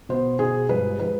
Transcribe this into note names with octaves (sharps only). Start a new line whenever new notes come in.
B2 B3 C5
B2 B3 G#4
G2 F3 G#3 B4
F3 G#3 B4